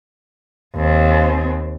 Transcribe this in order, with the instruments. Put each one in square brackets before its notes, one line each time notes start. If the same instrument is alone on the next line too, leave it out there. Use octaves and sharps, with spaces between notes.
[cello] D#2 C4